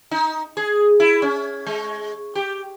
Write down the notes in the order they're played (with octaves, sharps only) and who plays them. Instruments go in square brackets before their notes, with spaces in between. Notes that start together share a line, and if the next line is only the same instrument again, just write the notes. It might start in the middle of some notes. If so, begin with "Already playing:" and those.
[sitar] D#4
G#4
E4
C#4
G#3
G4